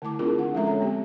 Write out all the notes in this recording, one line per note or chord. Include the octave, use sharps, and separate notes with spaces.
D3 A3 E4 A5 D6
C4 D4 E4 F4 G#4 A#4
D3 F#5
F3 G#3 C#4 A4 E5 A#5
C#5 A#5
B3 C4 G4